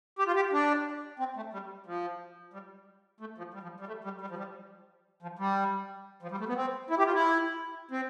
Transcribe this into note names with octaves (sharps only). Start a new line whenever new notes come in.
G4
F4
G4
D4
C4
A3
G3
F3
G3
A3
F3
G3
F3
G3
A3
G3
G3
F3
G3
F3
G3
F3
G3
A3
B3
C4
E4
G4
F4
E4
C4